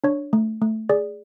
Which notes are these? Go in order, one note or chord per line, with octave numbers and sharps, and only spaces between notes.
D4 C#5
A3
A3
G#4 D5